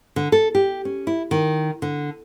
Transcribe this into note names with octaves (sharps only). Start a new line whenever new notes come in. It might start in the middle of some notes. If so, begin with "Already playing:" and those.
D3
A4
G4
C#4
E4
D#3
D3